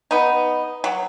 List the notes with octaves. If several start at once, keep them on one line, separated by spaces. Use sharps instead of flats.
B3 D#4
F#3